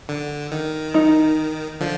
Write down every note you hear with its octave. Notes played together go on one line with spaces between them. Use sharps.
D3
D#3
D#4
D3 F3